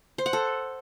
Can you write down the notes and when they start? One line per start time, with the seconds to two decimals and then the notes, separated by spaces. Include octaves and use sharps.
0.18 C5
0.26 F#5
0.33 A4